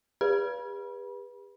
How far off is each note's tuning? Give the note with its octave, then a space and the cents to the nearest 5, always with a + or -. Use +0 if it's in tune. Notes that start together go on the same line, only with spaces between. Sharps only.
G4 +45 B4 -15 B5 -30